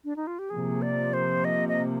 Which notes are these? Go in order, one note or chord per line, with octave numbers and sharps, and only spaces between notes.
D4
D#4
F4
G4
C3 F3 A#3 G#4
D5
C5
D#5
D#5